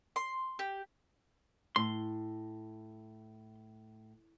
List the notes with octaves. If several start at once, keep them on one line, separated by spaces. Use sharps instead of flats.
C6
G4
A2 C6